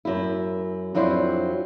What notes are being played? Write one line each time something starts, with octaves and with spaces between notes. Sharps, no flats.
F#2 E4
F2 F#3 D4 E4 C5